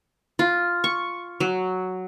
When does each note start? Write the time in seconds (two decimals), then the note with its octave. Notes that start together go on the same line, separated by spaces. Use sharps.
0.39 F4
0.84 C#6
1.40 F#3